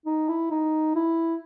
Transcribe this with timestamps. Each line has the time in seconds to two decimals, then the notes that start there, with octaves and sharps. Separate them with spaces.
0.06 D#4
0.28 E4
0.51 D#4
0.95 E4